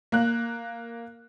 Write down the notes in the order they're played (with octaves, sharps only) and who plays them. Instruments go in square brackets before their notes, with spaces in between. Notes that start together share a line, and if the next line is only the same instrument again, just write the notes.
[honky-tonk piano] A#3 F#6